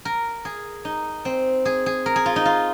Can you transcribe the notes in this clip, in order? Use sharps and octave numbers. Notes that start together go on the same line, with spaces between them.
A#4
G#4
D#4
C4
G#4
G#4
A#4
G#4
F4
D#4
F4